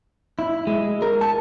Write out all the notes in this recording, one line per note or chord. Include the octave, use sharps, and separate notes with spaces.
E4
G#3
A#4
A5